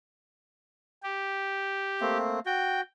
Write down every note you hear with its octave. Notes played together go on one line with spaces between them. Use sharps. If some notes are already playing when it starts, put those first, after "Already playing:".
G4
A3 A#3 C4
F#4 G5